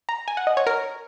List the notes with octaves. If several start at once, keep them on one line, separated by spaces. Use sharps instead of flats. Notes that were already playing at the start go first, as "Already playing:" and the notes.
A#5
G#5
F#5
D#5
C#5
A#4